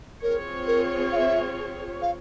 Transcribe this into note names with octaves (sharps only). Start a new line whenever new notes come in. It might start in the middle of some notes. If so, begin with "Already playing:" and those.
C4 F4 G#4 A#4 C#5
A#4
F5
E5
F5